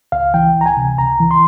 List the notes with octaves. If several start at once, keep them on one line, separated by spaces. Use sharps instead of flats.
C#2 F5
E3 G5
C#2
A#5
G#5
C3
C#2 A#5
E3
C6